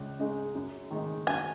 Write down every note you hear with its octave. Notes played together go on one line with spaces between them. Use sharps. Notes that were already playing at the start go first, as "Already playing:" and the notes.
Already playing: C#2
C#3 G#3 D#4
F#2
D#3 G#3 D#4
F#2 G#5